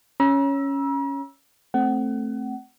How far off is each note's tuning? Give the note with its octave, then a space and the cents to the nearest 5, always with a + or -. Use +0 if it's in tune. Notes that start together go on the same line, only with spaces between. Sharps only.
C#4 +0 A#5 +45 E6 +0
A3 +0 C4 +5 F#5 +30